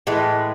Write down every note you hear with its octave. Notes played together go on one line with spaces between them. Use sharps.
A2 E3 G#3